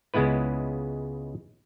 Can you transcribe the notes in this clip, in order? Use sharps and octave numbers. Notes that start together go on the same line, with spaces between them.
C#2 C#3 G#3 B3 E4 B4